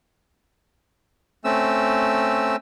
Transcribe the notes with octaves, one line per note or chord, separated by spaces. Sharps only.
A3 C4 C#4 E6